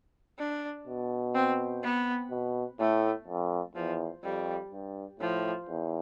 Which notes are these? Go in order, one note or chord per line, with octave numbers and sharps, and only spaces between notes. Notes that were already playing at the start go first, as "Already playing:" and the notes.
D4
B2
C4
B3
B2
A2 A3
F2
E2 F3
F2 G3
G2
A2 F3
E2